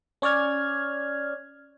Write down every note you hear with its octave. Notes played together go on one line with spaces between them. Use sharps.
C#4 C#5 D5 F6 G#6